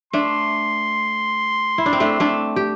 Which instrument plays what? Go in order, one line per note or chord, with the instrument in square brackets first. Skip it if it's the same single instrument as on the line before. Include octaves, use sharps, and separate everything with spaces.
[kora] A3 D4 [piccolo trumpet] C6
[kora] E4
D4
C4
A3 D4
A3 D4
G4